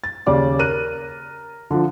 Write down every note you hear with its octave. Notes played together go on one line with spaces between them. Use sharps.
A6
D#2 C#3 D5 D6
A#4 F#6 D#7
D3 F3